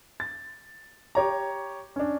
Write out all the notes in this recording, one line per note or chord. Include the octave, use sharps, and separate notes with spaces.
A6
G4 C#5 A#5
C#4 D4